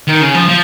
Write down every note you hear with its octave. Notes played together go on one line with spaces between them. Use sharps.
D#3
C#3
F3
F3